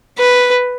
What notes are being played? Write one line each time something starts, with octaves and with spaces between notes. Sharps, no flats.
B4